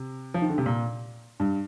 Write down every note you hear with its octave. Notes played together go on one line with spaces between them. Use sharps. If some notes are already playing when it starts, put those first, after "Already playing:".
Already playing: C3
F3
D#3
D3
C3
A#2
G2